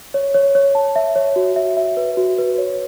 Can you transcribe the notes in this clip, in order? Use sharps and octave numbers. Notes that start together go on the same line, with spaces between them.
C#5
C#5
C#5
A5
E5
C#5
F#4
E5
E5
B4
F#4
B4
C#5